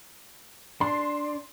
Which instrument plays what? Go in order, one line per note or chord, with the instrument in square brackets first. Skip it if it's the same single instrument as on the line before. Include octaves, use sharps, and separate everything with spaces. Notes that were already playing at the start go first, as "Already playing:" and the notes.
[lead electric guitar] D4 [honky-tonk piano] C6